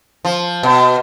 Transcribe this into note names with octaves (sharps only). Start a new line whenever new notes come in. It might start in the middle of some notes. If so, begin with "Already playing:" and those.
F3
B2